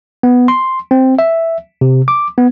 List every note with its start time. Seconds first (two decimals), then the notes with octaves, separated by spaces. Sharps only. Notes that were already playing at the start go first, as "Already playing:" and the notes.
0.23 B3
0.48 C6
0.91 C4
1.19 E5
1.81 C3
2.08 D6
2.38 B3